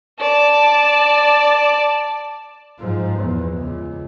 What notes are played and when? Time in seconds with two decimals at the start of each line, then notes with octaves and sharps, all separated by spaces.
0.21 D5 A5
2.80 G#2 F3
3.20 E2
3.58 C#2